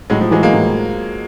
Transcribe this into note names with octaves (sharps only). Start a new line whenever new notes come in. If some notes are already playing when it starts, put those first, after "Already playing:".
A2 F#3 G#3
F3
E3 F#3 G#3
G#3 A#3
A2